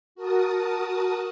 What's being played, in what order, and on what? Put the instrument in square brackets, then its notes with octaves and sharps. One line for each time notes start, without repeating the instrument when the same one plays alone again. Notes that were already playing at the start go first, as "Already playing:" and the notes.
[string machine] F#4 A#4 A5 D#6